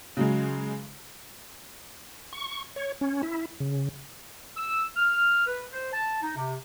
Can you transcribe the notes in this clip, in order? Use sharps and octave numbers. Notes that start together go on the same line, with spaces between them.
C#3 F#3 G#3
C#6
C#5
C#4
E4
C#3
E6
F6
B4
C5
A5
D#4
C3